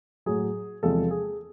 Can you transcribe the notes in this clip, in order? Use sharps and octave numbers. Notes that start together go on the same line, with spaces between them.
A2 F#3 G#4
E2 C3 F3 G#3 A4
G#4